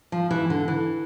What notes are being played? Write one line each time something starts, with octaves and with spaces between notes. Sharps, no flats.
F3
E3
D3
E3